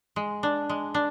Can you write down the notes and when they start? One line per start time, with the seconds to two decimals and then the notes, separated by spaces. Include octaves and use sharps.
0.16 G#3
0.43 D4
0.69 G#3
0.94 D4